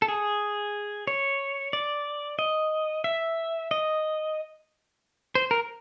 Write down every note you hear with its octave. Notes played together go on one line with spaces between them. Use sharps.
A4
G#4
C#5
D5
D#5
E5
D#5
C5
A#4